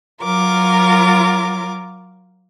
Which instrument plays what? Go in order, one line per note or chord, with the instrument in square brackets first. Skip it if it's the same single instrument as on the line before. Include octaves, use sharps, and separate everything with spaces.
[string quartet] F#3 F4 A#4 D6